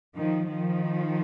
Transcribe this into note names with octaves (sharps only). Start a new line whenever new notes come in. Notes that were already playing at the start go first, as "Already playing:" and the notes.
D#3 F3
D#3 F3